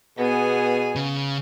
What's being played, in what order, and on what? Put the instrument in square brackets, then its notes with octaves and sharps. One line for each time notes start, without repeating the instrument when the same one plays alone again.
[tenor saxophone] B2 [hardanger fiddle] B3 G#5 [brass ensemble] G#4
[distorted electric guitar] C#3